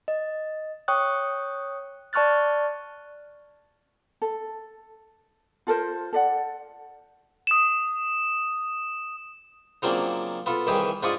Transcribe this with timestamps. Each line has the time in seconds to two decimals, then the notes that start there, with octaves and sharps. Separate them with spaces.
0.08 D#5
0.88 C#5 G5 C#6 D#6 F#6
2.13 D5 A5 C#6 F6 F#6 A6
4.22 A4
5.67 F4 A4 A#4 C5
6.13 A4 D5 F#5
7.47 D#6 E7
9.82 C#3 F3 F#3 A#3 C4 D4
10.46 B3 F4 A4
10.67 C2 D#3 E3 G4 G#4 D6
11.03 G#2 D4 F4 D5 C#6 D#6